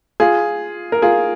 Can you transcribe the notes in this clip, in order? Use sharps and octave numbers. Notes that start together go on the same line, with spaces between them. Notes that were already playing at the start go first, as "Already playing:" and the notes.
F4 G#4
A#4
F4 G#4